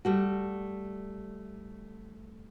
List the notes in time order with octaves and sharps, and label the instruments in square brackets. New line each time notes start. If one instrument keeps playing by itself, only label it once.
[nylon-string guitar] G3 A3 F#4